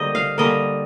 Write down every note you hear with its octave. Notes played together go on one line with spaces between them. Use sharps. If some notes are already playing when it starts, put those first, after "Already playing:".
Already playing: D3 G3 A#3 C5 D#5
F5
D3 G3 A#3 D#5